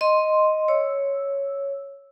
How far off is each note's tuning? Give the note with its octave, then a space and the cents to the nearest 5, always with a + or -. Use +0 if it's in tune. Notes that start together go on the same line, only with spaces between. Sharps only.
D#5 +0 C6 +0
C#5 +0 E6 +0